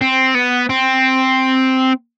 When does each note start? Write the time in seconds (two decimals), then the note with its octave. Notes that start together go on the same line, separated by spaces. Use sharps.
0.01 C4
0.35 B3
0.69 C4